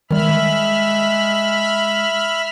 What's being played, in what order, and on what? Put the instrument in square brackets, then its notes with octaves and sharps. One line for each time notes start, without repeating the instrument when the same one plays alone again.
[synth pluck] D#3 G3 [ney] G#3 [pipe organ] E5 B5 F6